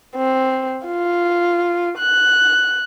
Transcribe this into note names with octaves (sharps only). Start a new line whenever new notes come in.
C4
F4
F#6